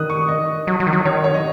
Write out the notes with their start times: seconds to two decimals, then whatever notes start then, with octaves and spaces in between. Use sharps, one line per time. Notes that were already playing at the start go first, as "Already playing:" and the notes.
Already playing: D#3 D#6 F#6
0.10 C#6
0.28 D#5
0.67 F#3
0.80 F#3
0.87 D#3
0.93 F#3
1.05 D#3 C#5
1.24 C#5
1.34 D#5